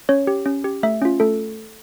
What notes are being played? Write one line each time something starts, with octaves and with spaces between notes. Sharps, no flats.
C#4 C#5
G4
C#4
G4
A3 E5
C#4 F4
A3 A4